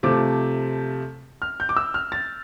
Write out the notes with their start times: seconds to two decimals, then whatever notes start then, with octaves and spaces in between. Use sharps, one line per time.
0.03 C3 F3 A3 D6
1.42 F6
1.60 G6
1.69 D6
1.77 E6
1.94 F6
2.12 A6